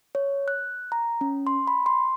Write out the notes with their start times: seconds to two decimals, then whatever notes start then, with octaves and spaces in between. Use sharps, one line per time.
0.15 C#5
0.48 F#6
0.92 A#5
1.21 C#4
1.47 C6
1.67 B5
1.86 C6